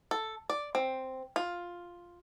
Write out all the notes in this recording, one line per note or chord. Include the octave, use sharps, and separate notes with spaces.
A4
D5
C4
F4